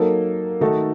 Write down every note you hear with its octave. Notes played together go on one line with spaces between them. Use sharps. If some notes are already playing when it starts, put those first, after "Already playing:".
Already playing: F#3 A#3 D#4 A4
D#3 A3 D#4 F#4 A4